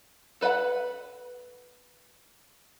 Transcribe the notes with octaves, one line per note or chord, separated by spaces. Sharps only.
A4 B4 D#5 F#5 B5